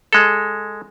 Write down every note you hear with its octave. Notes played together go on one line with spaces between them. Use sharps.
G#3 A4